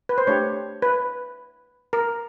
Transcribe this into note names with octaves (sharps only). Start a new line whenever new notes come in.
B4
C5
A3 D4 G4 C#5
B4
A#4